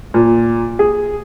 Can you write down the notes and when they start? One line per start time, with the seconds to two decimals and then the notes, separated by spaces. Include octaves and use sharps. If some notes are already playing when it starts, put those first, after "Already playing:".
0.14 A#2
0.79 G#4